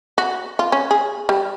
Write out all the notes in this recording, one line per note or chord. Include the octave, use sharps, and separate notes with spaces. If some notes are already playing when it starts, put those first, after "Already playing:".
F#4
F4
C#4
G#4
G3